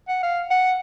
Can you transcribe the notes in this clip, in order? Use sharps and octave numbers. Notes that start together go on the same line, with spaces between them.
F#5
F5
F#5